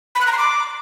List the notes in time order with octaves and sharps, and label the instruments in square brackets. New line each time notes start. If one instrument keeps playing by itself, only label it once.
[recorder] B5
F#6
A#5
C6
D6